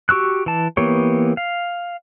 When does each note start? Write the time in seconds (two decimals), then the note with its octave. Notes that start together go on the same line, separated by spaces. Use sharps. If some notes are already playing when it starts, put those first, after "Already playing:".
0.09 F#4 G4 C#6 E6 F#6
0.46 E3 A5
0.77 E3 A#3 B3 G4 C#5
1.37 F5